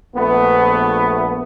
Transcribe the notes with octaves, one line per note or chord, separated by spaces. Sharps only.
A#1 A3 B3